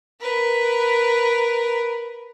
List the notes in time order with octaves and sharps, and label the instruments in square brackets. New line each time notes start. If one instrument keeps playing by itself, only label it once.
[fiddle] A#4 B4